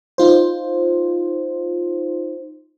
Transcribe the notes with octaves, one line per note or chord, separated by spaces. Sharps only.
D#4 F4 C5